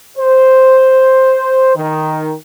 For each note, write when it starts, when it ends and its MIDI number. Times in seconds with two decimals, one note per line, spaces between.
0.17 1.74 72
1.76 2.34 51